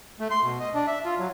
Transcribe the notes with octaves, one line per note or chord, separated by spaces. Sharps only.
A3
C6
B2
D#5
D4
E5
F4
F#3